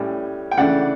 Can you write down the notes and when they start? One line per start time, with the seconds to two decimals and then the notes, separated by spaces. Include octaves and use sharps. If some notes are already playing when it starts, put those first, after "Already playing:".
Already playing: A2 G3 C#4
0.51 G5
0.57 C#3 E3 A3 D4 D5 F#5